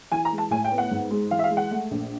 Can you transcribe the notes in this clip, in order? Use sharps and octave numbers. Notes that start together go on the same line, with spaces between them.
E3 G#5
A#5
G#3
A5
A2 G#5
G5
B3
F#5
G#2
G#3
E3 F5
E5
F5
G#3
F#5
A3
A#1